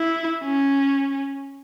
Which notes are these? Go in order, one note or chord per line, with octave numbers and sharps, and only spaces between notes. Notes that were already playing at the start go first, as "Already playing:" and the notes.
Already playing: E4
C#4